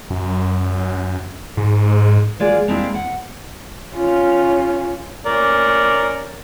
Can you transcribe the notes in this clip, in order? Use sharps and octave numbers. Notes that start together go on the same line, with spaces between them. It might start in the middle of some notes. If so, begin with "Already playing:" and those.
F#2
G#2
F#3 G#3 A#3 F4 G#4 D5
G#3 A#3 C4 D4 E4 G4
F#5
C#4 F4
C#4 A#4 D5